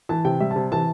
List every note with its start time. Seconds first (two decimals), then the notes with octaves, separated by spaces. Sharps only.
0.09 E3 A5
0.25 C3 G5
0.40 G3 E5
0.51 C3 A5
0.72 E3 A5